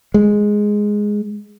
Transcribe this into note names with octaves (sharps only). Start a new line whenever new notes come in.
G#3